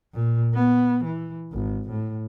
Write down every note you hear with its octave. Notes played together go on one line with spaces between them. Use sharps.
A#2
B3
E3
G#1
A2